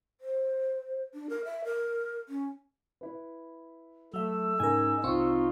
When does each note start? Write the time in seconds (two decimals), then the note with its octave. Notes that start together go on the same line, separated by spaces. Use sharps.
0.21 C5
1.14 D4
1.29 A#4
1.45 E5
1.65 A#4
2.29 C#4
3.01 E4 B4
4.14 F#3 A3 E5 E6
4.60 G#2 C#3 D#4 A#4 G#5
5.04 C2 C4 D#4 F4 C#6